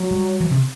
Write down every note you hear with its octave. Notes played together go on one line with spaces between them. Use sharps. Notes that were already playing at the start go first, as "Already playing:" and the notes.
Already playing: F#3
G3
E3
C3